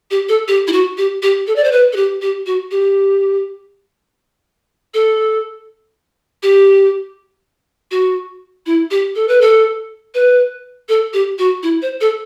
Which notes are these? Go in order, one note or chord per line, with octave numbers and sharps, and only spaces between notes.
G4
A4
G4
E4
F#4
G4
G4
A4
D5
C5
B4
A4
G4
G4
F#4
G4
A4
G4
F#4
E4
G4
A4
B4
A4
B4
A4
G4
F#4
E4
C5
A4